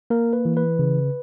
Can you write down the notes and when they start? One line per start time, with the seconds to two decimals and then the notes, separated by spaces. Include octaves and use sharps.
0.10 A#3 A#4
0.33 B4
0.45 E3
0.57 B4
0.79 C#3